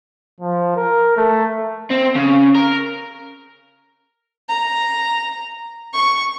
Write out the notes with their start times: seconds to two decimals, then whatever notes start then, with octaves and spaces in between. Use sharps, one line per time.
0.41 F3
0.76 A#4
1.17 A3
1.90 C4
2.15 C#3
2.55 A#4
4.49 A#5
5.93 C#6